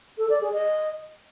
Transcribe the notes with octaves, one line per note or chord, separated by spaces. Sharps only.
A4
D5
G#4
D#5